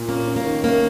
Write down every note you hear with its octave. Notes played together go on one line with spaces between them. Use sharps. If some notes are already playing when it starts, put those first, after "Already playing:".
Already playing: A#2
A#3 C#4
C#4
A#3
D#3
A#3 C#4